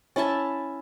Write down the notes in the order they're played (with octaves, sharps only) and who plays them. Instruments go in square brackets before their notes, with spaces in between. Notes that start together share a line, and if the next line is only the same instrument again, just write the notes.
[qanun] C#4 E4 E5 A5